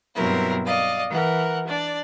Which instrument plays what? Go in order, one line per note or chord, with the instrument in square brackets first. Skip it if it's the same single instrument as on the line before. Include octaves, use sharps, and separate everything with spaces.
[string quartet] G2 B2 F#3 C4 E4 A#4
D5 D#5 F5
E3 A#4 F#5
D4 D5